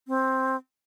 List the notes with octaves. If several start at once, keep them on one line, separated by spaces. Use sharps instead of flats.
C4